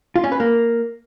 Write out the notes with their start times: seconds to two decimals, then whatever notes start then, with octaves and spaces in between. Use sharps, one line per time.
0.16 F4
0.24 C#4
0.32 B4
0.40 A#3